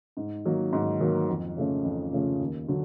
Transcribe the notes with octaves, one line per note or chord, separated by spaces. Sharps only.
G#2
D#3 F#3 A#3
G#2
D#3 F#3 A#3
F2
C#3 F3 A3 C#4
F2
C#3 F3 A3 C#4
D#2
D3 F#3